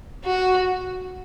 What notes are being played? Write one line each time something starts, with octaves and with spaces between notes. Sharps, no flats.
F#4